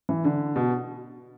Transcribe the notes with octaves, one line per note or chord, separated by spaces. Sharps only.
E3
D3
B2